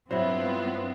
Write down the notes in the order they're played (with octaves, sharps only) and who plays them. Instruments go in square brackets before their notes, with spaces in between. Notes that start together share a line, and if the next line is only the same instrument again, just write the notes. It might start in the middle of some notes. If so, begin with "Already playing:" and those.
[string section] G2 B3 F4 [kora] F#3 E4 [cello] C4 [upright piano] C5